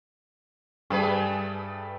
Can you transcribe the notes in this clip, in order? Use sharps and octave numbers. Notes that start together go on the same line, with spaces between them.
G2 A3 G#4 B4